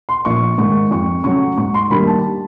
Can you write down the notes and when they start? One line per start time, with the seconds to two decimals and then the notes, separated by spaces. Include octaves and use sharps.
0.09 C6
0.25 A#1 C#6
0.58 G#2 D#3 G#3 C#6
0.91 F2 C#6
1.24 C#3 F#3 A3 C#4 C#6
1.57 G#2 C#6
1.74 C6
1.90 D#3 G3 A#3 D4 B5
2.07 A5